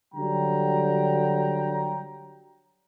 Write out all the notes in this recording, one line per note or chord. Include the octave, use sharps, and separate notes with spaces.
D3 F#3 G3 G5 A#5